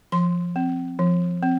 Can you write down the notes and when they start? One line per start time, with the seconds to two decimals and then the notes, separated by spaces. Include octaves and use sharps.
0.12 F3 C6
0.56 C4
0.99 F3
1.43 C4